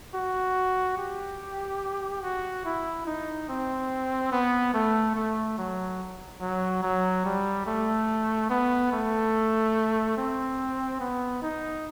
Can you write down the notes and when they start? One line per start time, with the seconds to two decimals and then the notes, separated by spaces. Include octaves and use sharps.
0.15 F#4
0.98 G4
2.23 F#4
2.65 E4
3.07 D#4
3.49 C4
4.32 B3
4.74 A3
5.16 A3
5.58 F#3
6.41 F#3
6.83 F#3
7.25 G3
7.66 A3
8.50 B3
8.92 A3
10.17 C4
11.00 B3
11.42 D#4